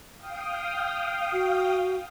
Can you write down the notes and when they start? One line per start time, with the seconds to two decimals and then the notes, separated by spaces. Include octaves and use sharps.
0.18 F5 G5 D#6
1.33 F#4